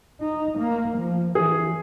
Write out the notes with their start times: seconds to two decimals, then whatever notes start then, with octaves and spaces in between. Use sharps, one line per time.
0.21 D#4
0.58 A#3
0.97 F3
1.35 E3 G#4